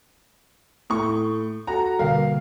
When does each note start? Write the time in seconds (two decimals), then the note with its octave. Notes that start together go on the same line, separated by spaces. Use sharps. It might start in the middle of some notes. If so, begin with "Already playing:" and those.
0.90 A2 C#6 D#6
1.67 F#4 A4 A#5
1.99 B2 D3 G3 A#3 F5